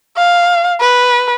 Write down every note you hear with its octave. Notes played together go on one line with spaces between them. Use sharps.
F5
B4